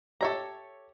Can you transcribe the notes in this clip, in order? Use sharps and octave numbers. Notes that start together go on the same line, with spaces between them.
G4 A4 C#5 E5 A#5 C#6